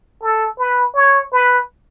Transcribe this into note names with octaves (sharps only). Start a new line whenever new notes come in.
A4
B4
C#5
B4